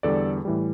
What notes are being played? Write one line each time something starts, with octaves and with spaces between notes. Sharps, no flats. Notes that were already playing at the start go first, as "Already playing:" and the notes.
E2 D3 G3 A4 D5
A2 E3 G3